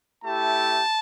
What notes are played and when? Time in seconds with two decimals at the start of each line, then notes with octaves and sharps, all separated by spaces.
0.23 A3 E4 G4 A5